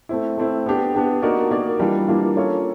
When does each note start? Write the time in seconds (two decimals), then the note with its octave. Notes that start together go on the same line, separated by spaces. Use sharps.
0.09 A3 C4 E4
0.37 A3 C4 E4
0.66 B3 D4 G4
0.95 B3 D4 G4
1.22 A#3 D#4 F#4 A#4 D5
1.51 A#3 D#4 F#4 A#4 D5
1.79 E3 G3 A#3 D4 F4
2.08 E3 G3 A#3 D4 F4
2.36 A#3 C#4 F4 A4 C#5